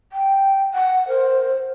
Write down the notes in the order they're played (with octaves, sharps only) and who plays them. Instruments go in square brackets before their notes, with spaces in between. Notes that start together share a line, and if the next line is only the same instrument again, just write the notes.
[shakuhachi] G5
F#5
[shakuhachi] A#4 [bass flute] C5